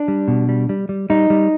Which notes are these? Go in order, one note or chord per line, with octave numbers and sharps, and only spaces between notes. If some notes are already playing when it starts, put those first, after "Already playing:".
Already playing: D4
G3
B2
G3
G3
G3
G3 D#4
G3